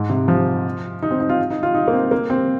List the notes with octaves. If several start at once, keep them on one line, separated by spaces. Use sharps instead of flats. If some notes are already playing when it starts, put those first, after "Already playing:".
Already playing: G#2
C3
F3
D#4
C4
D#4
F4
D#4
F4
D#4
A#3
C4
A#3
C4